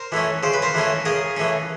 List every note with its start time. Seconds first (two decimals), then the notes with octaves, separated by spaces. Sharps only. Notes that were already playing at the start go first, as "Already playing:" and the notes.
Already playing: A#4 C5
0.12 E3 A3 C#4
0.43 C#3 C5
0.53 B4
0.62 A#4 C5
0.74 E3 A3 C#4
1.05 C#3 G#4 A#4
1.37 E3 A3 C#4